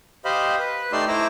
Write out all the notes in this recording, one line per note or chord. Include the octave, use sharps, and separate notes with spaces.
G4 C5 D#5 F5 B5
B4
A3 D#4 G4 D5 C6 E6
A3 E4 C5 A#5 D6 E6